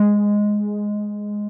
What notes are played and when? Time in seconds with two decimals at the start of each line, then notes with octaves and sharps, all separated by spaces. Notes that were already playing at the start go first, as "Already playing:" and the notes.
Already playing: G#3